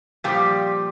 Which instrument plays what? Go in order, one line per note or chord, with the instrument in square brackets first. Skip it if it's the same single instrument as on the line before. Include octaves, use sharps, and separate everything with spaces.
[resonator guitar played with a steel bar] A#2 F3 G3 G4